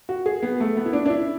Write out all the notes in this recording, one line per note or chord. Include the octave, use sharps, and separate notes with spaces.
F#4
G#4
B3
A3
B3
E4
D4
D4
E4